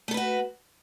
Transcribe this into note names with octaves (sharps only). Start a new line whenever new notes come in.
A3 F#4 A4 B4